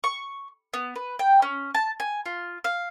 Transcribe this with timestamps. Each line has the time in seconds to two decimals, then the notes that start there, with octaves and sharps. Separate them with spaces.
0.04 C#6
0.74 B3
0.96 B4
1.19 G5
1.42 C#4
1.75 A5
2.00 G#5
2.26 F4
2.64 F5